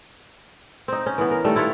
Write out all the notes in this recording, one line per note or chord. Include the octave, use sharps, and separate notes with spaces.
C4 D#4
C#4
E3 B3
A#4
D#3 G3 A3
E4 F4 B4 C#5